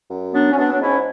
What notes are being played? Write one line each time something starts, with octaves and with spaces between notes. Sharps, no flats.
F#2
F#3 B3 D4
C#4
F#3 B3 D4
D4
G#2 C#4 E4